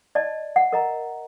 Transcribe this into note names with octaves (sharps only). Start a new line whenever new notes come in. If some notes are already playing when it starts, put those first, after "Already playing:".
D5 D#5 A5
F#5
A#4 D#5 A#5